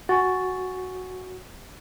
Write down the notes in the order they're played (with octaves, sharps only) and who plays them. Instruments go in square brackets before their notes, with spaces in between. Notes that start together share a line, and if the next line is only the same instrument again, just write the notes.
[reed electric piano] F#4 [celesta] G#5 C#6 A6